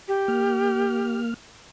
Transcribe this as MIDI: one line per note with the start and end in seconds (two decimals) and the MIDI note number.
0.08 1.19 67
0.28 1.34 58
0.28 1.34 89